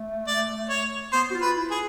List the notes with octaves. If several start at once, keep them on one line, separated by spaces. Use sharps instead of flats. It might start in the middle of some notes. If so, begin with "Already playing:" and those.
Already playing: A3
D5
C#5
B3 C5
F#4
F4
B4
E4
G#4